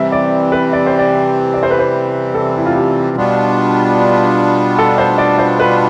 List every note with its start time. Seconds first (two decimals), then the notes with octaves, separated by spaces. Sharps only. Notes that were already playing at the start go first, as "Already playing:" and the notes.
Already playing: C3 E3 G3 C4 E5
0.12 D5
0.52 B4
0.73 D5
0.86 C5
0.99 D5
1.54 D5
1.63 C5
1.71 B4
1.79 C5
2.35 A4
2.57 E4
2.66 F4
2.75 G4
3.17 B2 G3 B3 D4 F4
4.78 A4
4.98 C5
5.18 D5
5.38 C5
5.60 B4